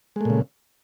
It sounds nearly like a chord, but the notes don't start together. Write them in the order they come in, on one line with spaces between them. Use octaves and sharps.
G#3 A3 A#2 C#3